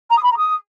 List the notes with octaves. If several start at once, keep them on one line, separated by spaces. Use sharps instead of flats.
A#5
D#6
B5
A#5
D#6